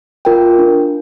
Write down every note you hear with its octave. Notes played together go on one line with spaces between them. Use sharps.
F4 A#4 G5
D4